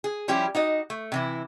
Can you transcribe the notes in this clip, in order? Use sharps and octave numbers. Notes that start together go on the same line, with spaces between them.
G#4
F3 G3 C#4 E4 G4
D#4 F#4 D#5
A3
C3 E3 E4